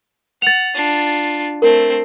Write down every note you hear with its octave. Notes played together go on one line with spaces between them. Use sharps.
F#5 A6 F7
D4 F4
A3 C4 A#4